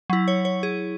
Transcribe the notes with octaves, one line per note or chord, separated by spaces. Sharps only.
F#3 E4
C#5
C#5
G#4